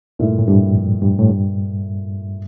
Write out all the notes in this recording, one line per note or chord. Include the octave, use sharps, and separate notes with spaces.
G2 A#2 A3 E4
A2
G2
F2
G2
A2
G2